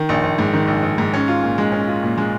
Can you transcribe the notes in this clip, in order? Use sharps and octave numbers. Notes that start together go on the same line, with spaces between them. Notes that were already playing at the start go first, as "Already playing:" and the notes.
Already playing: D#3
A#1
A#1
G#2
D#3
A#1
A#1
G#2
C#4
F4
A#2
G#3
C#4
F4
A#2
G#3